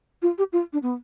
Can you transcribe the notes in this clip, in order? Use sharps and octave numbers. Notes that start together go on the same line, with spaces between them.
F4
G4
F4
D4
B3